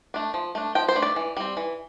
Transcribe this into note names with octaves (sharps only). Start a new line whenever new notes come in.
A3 D4
F3
A3 D4
F3 G5
C5
A3 D4
D5
E3
G3 C4
E3